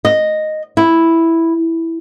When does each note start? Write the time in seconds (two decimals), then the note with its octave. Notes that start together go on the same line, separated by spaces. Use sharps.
0.05 D#5
0.77 E4